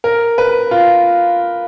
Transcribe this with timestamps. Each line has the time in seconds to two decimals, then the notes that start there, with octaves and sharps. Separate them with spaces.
0.04 A#4
0.38 B4
0.71 F4